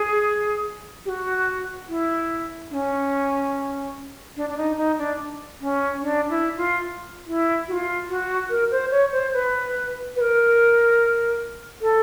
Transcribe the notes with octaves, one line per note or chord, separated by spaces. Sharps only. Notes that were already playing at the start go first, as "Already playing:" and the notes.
Already playing: G#4
G4
F#4
E4
D4
C#4
D4
D4
D#4
D#4
D4
C#4
D4
E4
F4
E4
F#4
F4
F#4
A#4
C5
C#5
C5
B4
B4
A#4
A4